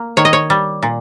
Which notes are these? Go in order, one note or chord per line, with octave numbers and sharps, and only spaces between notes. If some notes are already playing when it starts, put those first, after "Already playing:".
Already playing: A#3
D#3 C#5
D#5
C#5
G3
A#2